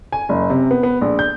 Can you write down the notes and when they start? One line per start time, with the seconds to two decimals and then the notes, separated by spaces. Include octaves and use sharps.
0.12 G#5
0.29 F#1
0.50 C3
0.71 B3
0.83 B3
1.01 A#1
1.19 G6